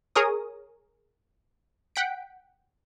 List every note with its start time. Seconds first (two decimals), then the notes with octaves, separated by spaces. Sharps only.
0.16 G#4 A#4 C#5 D#6
1.96 F#5 G5 B6 D7